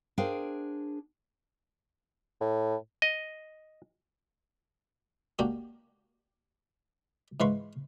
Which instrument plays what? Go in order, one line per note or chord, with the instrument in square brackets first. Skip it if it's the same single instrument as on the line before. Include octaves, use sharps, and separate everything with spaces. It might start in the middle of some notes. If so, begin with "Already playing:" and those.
[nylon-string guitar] D4 G#4 A#4 C5 F5 G5
[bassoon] A2
[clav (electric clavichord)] D#5
[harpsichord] A#3 D4 F#4 G4
G#2 E3 B4 F5 C6 C#6